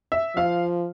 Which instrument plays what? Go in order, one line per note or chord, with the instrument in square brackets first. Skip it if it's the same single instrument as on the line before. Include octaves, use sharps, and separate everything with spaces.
[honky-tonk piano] E5
[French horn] F3 [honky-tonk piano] F5